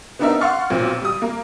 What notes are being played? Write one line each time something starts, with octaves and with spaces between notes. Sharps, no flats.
B3 C4 D4 D#4 A#4 E5
F5 F#5 C6 C#6 F6 A6
B1 A#2 C4
G3 D#6
A#3